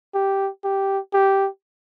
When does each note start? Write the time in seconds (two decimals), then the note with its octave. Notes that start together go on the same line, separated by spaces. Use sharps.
0.15 G4
0.64 G4
1.14 G4